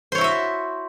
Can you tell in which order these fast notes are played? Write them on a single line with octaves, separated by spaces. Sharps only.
C5 C#5 E4 F#4 E5